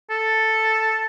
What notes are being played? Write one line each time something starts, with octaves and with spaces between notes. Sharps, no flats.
A4